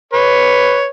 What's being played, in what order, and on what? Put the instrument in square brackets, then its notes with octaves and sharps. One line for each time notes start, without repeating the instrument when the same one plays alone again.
[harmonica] B4 C#5